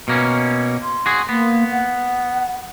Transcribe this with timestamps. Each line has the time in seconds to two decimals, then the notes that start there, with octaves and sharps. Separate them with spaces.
0.08 B2 A#3 C#4
0.82 C6
1.06 F#4 G#4
1.29 A#3 B3
1.72 F#5